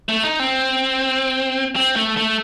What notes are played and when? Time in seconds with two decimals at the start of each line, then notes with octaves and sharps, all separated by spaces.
0.09 A3
0.23 D#4
0.40 C4
1.76 C4
1.96 A3
2.17 A3